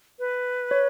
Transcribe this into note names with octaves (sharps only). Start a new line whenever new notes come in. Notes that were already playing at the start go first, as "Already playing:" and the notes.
B4
C#5